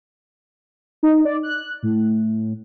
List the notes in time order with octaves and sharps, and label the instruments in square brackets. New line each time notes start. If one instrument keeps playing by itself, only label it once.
[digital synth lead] D#4
D5
F#6
A2